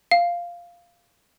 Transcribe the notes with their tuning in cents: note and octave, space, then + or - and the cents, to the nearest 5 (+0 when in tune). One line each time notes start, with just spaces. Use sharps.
F5 -5